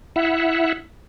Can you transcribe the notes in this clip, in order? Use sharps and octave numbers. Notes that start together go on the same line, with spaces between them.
E4 E5 F#5